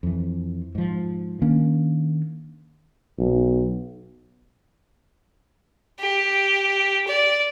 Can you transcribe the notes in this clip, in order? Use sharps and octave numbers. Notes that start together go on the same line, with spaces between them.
F2 E3
G#2 F3
D#3 A#3 C#4 D4
B1
G4
D5